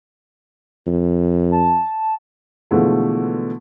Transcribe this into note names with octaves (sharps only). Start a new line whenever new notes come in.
F2
A5
B2 D3 E3 F3 G#3 A3